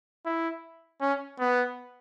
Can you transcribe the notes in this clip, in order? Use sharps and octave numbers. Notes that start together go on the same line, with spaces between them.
E4
C#4
B3